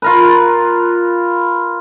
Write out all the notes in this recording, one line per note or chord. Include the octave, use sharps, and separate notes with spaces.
F4 A#4 B4